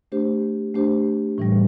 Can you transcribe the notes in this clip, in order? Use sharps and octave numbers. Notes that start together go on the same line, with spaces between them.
A3 D4 G4 C5
A3 D4 G4 C5
A2 E3 G3